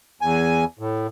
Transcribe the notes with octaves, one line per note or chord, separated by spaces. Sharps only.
E2 G#5
A2